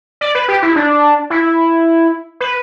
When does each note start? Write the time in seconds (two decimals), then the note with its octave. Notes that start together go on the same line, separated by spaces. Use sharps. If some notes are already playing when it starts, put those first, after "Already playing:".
0.21 D5
0.35 B4
0.48 G4
0.62 E4
0.76 D4
1.30 E4
2.40 B4